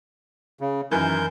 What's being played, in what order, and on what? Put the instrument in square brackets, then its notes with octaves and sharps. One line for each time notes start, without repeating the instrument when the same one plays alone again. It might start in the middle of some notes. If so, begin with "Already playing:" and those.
[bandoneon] C#3
[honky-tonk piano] F#2 D#3 E3 [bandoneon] A#4 G6